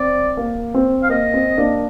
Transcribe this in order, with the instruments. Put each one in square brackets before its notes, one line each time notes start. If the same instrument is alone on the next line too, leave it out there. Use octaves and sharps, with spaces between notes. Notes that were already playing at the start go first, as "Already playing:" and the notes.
Already playing: [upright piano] C4 [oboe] D5
[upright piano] A#3
C4
[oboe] F5
[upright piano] A#3 [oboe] D#5
[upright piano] C4
A#3 D4